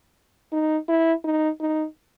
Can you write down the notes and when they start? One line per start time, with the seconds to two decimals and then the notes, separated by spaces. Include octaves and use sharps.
0.52 D#4
0.88 E4
1.24 D#4
1.60 D#4